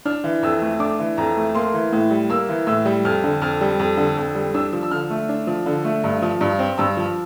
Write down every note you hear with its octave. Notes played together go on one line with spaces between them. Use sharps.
D4 F6
E3
F2 E6
A3
D4 D6
E3
F2 A#5
A3
A#3 C6
E3
A2
G3
A#3 E6
E3
A2 E6
G3
F2 F6
D3
F2 F6
G3
F2
D3
F2
G3
D4 E6
F3
E6
D3 F6
A3
D4
F3
D3
A3
G2
F3
G2
C4
G2 E6
F3